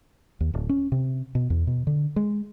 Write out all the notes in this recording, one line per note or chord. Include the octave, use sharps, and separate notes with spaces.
D#2
D1
C#4
C3
B2
E2
B2
D3
G#3